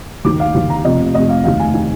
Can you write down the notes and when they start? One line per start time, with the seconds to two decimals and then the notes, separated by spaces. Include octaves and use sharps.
0.25 D#2 D#3 D6
0.40 F5
0.55 D#2 D#3
0.70 A#5
0.85 F1 F2 C3 D#5
1.15 F1 F2 C3 D#5
1.29 F5
1.44 F1 D#2 D#3 F5
1.59 G#5
1.74 D#3 G#5